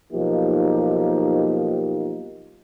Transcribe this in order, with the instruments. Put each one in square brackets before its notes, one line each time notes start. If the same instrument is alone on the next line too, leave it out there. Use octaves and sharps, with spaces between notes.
[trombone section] B1 F3 A#3 D#4 G4